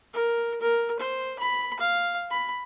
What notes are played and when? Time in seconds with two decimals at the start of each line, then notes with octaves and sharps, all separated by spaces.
0.13 A#4
0.61 A#4
0.99 C5
1.39 B5
1.80 F5
2.31 B5